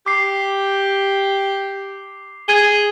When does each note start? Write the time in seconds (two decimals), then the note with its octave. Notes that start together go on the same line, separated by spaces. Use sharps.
0.06 G4 D6 C7
2.48 G#4 G#6 D#7 G7